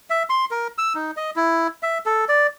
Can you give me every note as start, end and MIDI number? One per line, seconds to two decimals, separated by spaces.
0.10 0.23 76
0.30 0.45 84
0.51 0.68 70
0.78 0.93 88
0.95 1.11 63
1.17 1.31 75
1.36 1.67 64
1.83 1.98 76
2.06 2.25 69
2.29 2.47 74